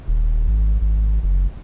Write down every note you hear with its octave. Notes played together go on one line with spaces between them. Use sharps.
D#1
G#1
G#1
F#1